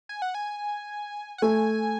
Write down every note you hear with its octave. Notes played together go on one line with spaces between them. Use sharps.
G#5
F#5
G#5
F#5
A3 G#5